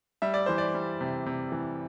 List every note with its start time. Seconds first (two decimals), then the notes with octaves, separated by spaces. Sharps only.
0.22 G3 E5
0.34 D5
0.46 E3 C5
0.58 D5
0.74 G3
1.01 C3
1.26 C3
1.52 E3